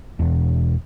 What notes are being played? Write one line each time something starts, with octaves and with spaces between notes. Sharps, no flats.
E1